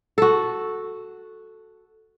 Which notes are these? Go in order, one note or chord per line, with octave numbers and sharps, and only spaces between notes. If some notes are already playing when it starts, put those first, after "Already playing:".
F#4 A4